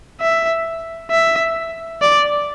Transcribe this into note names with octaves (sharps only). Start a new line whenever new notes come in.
E5
E5
D5